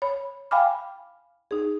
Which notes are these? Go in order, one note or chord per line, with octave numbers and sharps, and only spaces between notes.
C#5 B5
F5 G5 G#5 B5 D6 F6
D#4 G#4